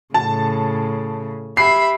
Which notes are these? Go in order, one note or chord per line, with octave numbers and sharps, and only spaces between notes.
A2 C#3 A5
G4 E5 B5 C7